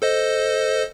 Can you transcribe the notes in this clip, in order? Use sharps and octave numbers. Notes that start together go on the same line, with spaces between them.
A4 C5 D#5